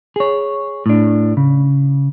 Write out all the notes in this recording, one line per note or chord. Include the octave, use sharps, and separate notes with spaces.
G#4 C#5
A2 D4
C#3